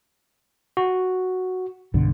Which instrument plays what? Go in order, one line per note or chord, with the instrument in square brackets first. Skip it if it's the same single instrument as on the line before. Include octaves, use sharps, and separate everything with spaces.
[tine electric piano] F#4
[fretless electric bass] B1 G2 D3